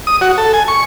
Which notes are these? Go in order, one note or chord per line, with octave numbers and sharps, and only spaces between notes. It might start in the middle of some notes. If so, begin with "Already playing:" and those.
D#6
F#4
A4
G#5
C#6